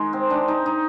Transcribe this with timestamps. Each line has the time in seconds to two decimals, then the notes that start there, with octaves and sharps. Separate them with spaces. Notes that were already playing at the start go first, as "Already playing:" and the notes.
Already playing: D#3 G#3
0.13 C4
0.30 D4
0.48 D#4
0.66 D#4